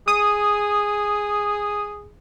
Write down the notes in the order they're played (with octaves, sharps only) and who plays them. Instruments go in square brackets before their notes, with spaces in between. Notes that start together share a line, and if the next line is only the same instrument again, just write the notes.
[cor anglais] G#4 [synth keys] D#6